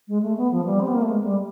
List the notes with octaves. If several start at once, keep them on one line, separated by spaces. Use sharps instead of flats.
G#3
A3
B3
F3
G3
C4
B3
A#3
A3
G#3
G3